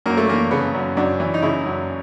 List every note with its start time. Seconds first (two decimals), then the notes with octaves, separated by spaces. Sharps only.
0.06 F#2 A#3
0.17 A3
0.28 E3 A#3
0.51 C#3 B3
0.74 F#2
0.97 F#2 D4
1.20 E3
1.34 D#4
1.42 C#3 E4
1.65 F#2